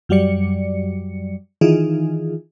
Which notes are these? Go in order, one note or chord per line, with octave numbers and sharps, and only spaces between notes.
F#2 F#3 G3 D5 C#7
D#3 E3 D#4 F4 G#4